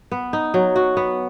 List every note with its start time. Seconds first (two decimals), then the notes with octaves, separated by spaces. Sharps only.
0.11 B3
0.33 D#4
0.54 F#3
0.76 F#4
0.97 B3